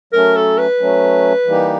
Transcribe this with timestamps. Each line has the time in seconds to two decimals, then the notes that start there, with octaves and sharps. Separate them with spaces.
0.13 F#3 A3 C#4 A#4
0.36 A4
0.58 B4
0.80 F#3 A3 C#4
1.46 E3 G3 A#3 D#4 G4